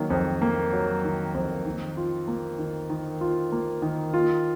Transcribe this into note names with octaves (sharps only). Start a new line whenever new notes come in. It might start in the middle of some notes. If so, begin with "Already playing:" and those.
Already playing: D#3 F#3 A#3
F2
A#3
F#3
D#3
F2
D#3
F4
A#3
D#3
D#3
F4
A#3
D#3
F4